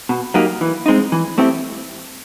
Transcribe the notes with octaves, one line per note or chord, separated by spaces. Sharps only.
B2
F#3 A#3 D#4 G4
E3
G#3 C4 D#4
E3
A3 C4 E4 G4